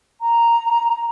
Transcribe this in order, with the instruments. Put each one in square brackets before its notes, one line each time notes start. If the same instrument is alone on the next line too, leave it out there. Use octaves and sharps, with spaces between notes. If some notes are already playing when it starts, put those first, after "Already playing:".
[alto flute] A#5